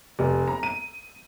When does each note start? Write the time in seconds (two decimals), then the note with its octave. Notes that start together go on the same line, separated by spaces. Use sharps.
0.19 F1
0.48 A#5
0.63 D#7